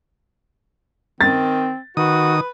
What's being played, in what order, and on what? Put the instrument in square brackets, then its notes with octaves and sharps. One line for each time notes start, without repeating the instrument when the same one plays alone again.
[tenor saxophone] D#3 [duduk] C4 [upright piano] A6
[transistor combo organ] D#3 D#6 [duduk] F#4 [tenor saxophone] B4